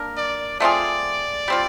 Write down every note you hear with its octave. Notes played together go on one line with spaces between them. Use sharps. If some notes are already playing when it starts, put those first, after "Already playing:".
Already playing: A#3 D4 A#4
D5
A3 C4 F4 G#4 D5
G3 C4 F4